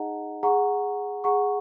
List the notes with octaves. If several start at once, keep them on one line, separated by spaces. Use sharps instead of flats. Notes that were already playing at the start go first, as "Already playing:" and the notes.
Already playing: D#4 G#4 D#5 F#5 A#5
G#4 F#5 A#5 C#6
G#4 F#5 A#5 C#6